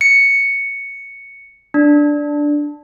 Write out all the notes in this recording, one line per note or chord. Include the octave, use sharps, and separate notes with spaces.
C#7
D4